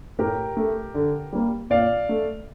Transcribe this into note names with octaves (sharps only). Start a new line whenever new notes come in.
A2 G4 A#4
A3
D3
G3 A#3
A#2 D5 F5
A3